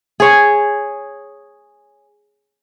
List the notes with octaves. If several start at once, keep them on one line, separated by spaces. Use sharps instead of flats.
G#4 C#5